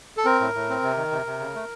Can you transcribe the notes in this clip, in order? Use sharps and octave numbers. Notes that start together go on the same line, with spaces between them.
A4
C4 A#4
A2
A2
C4
C3
D#3
C3
C3
C#3
A3